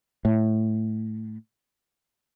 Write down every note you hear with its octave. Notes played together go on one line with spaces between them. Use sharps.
A2